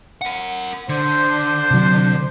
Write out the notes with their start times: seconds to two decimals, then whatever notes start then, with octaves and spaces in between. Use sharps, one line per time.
0.21 A#4 F#5
0.89 D3 D4 C5
1.71 C3 F#3